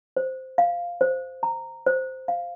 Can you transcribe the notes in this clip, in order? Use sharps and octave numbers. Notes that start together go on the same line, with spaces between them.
C5
F5
C5
A#5
C5
F5